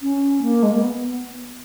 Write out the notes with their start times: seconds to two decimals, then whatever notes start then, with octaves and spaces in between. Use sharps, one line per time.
0.02 C#4
0.42 A#3
0.63 G#3
0.72 A#3
0.81 B3